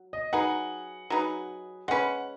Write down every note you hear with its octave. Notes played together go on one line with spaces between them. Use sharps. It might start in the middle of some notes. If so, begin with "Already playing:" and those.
Already playing: F#3
D#5
F#3 D#4 G#4 B4 F#5
F#3 D#4 G#4 B4
G#3 C#4 B4 F#5